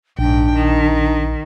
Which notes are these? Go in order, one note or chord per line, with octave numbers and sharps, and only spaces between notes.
A#1 G#2 D4 G5
D#3